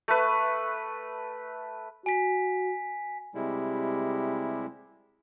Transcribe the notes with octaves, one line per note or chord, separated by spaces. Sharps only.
A3 B4
F#4 G#5 B6
C3 G3 G#3 E4